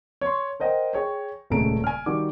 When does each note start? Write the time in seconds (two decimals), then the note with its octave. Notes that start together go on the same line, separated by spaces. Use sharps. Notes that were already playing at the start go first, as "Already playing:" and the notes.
0.21 C#5 C6
0.60 A#4 C5 D#5 F#5 G5
0.93 G#4 C#5 G5
1.50 D#1 C#2 C#3 A3 A#5 D7
1.84 G#5 F6
2.06 D#3 G3 F#4 D6